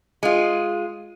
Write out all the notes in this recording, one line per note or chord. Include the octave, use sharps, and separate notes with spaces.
G#3 F4